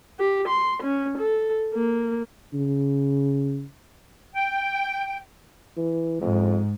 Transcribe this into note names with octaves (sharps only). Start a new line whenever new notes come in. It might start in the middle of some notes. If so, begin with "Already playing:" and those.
G4
C6
C#4
A4
A#3
C#3
G5
E3
F2 G#2